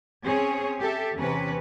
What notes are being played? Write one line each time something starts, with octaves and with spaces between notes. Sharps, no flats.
C4 C#4 G#4 C#5
G4 A4 E5
E2 C3 C#4 B4